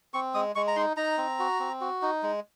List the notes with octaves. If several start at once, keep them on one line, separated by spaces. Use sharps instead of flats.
C4 C#6
G#3 D#6
G#3 C#6
A#5
D#4 C6
D#4 A#5
C4
F#4
C4
F#4
D#4
G#3